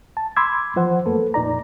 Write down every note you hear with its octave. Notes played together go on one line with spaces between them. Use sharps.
A5
B5 C6 D6 E6 G#6
E3 F3 C5 F#5
F#2 A3 A#3 A4 B4
F2 A#2 D#4 D5 A#5